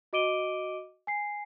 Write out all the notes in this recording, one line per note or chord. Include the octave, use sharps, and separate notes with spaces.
F#4 D#5 D6 D7 D#7 G7
G#5 C7